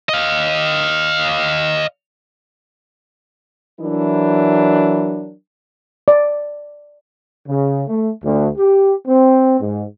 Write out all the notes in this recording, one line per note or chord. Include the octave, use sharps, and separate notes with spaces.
D#5 F5
E3 F#3 D4 E4 A#4
D5
C#3
A3
D2
G4
C4
G#2